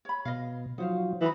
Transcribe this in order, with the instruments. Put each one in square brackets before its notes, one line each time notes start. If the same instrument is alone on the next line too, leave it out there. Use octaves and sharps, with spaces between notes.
[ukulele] C#5 B5
[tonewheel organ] B2 [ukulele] D#5 F5
[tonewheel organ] F3 F#3 [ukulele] D#4 C5 F5
[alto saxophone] E3 [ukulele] D#4 F#4 B5